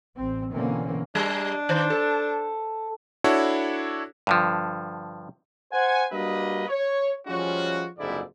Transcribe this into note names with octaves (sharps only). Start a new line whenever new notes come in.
A1 C4
B2 D3 E3 A#3 C4 C#4
G3 D4
D#3 C5
A4
D4 E4 F#4 A4 C#5
G2 D3 F3
C5 F#5 G#5
G3 A#3 D4 F#4 B4 D#5
C#5
F3 G3 G#3 C#4 F4 F#4
F#1 F2 G#2 D3 E4 D5